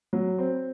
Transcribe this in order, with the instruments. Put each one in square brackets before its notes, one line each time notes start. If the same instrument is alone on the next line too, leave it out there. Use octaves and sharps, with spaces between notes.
[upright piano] F#3
C4